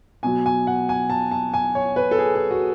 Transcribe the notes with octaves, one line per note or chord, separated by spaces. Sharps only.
B2 F#3 G#5
G#5
F#5
G#5
A5
A5
G#5
C#5
B4
A4
G#4
G#4
F#4